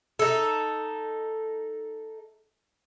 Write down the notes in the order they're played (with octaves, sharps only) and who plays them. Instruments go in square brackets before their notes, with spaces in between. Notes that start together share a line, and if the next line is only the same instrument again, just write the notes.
[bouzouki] D#4 A4